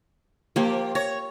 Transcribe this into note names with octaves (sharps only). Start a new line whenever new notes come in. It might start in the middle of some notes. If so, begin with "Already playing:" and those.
F3 A#3 G4
C#5 A#5